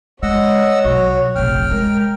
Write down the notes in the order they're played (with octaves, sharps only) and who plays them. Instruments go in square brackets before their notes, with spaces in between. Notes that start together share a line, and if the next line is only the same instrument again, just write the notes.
[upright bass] G#3 [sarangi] C#5 [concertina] D#5 F#5 E6
[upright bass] B1 [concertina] F#4
[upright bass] F1 A#1 [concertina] G5 F6
[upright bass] G#3 [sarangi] A#4